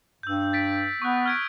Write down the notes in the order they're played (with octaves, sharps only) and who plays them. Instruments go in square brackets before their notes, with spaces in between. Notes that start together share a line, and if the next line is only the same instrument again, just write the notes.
[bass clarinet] G2 [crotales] E6 G6
[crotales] A6 B6 D7
[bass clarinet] B3 [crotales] C#6 D#6 F#6
[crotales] F6 G#6 D7